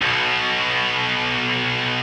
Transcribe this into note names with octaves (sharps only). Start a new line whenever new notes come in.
B1 B2